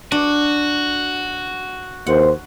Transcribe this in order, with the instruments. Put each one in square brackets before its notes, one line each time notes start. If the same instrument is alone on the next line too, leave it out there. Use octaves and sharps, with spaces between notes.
[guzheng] D4 [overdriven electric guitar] F#4
[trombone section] D#2 C5 [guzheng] F#5